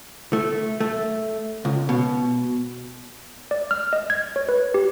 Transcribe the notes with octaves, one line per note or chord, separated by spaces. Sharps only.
A3
A3
C#2
B2
D5
F6
D#5
G#6
C#5
B4
G4